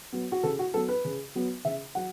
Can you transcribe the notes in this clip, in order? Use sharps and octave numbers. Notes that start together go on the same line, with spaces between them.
F#3 B3
F#4
C#3 A4
F#4
F#3 B3 A4
B4
C#3
F#3 B3
C#3 E5
F#3 F#5